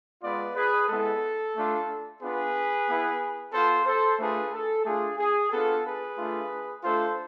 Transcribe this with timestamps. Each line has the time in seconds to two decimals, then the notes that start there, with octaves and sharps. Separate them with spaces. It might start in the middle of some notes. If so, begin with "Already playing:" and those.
0.22 G#3 B3 F4 B4 D5
0.55 G#4 B4
0.88 G#3 B3 E4 A4
1.55 A3 D4 F4
2.21 B3 D4 F4 G#4 B4
2.86 B3 E4
3.52 B3 F4 A4 C5
3.85 A4 C5
4.18 A3 D4 F4 G#4 B4
4.52 A4
4.85 A3 D4 F4 G#4
5.18 G#4
5.51 B3 D4 F4 A4
5.85 G#4 B4
6.18 A3 D4 F4
6.83 A3 D4 F4 A4 C5